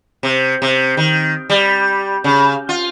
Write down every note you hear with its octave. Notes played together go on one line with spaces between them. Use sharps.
C3
C3
D#3
G3
C#3
F4